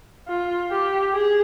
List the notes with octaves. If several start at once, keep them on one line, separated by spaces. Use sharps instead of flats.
F4
G4
G#4